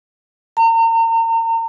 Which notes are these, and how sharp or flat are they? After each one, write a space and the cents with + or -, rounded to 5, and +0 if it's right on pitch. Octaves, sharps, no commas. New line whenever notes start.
A#5 -40